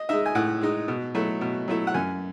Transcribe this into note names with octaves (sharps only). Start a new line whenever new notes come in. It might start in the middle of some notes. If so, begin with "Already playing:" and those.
Already playing: D#5
G#3 D#4 E5
G#5
A2 F#5
G#3 D#4
B2
F#3 A3 E4
B2
F#3 A3 E4
F#5
F#2 G#5